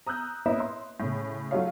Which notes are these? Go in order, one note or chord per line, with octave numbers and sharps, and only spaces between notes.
A#5 D#6 E6 F#6 G6
A#3 C#4 E4 B4 D#5 E5
C6
A2 C#3
F#3 A3 D#4 F4 C#5 F5